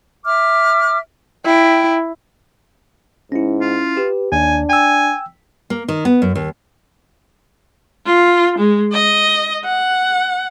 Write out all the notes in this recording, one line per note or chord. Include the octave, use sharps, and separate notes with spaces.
E5 D6 F6
E4 G5
G#2 C#4 E4
F4
G4 B4
D#2 D4 G#5
G5 G#5 E6
A#3
D#3
B3
F#2
D#2
F4
G#3
D#5
F#5